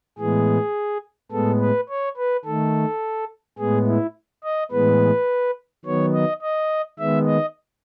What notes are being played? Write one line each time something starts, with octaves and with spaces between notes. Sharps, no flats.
A2 E3 G#3 B3 G#4
A2 G#3 B3 A4
B4
C#5
B4
D#3 A3 A4
A2 G#3 B3 G#4
E4
D#5
A2 E3 G#3 B3 B4
D#3 F#3 B3 C#5
D#5
D#5
D#3 G#3 B3 E5
D#5